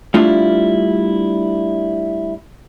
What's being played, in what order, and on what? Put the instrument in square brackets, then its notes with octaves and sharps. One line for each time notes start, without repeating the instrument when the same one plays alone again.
[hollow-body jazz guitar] G3 A3 D4 E4 F4 F5